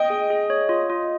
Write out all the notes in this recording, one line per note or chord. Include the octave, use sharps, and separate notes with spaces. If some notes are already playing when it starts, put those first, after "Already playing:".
Already playing: D#5 G5
G#4
G#4
C#5
F4
F4